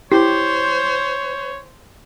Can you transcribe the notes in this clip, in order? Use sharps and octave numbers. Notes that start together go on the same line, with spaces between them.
E4 G4 C5 C#5